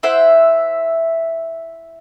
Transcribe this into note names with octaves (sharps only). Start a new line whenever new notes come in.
E4 C5 E5 F#5